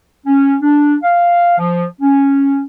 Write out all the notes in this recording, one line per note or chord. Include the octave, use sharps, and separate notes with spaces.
C#4
D4
F5
F3
C#4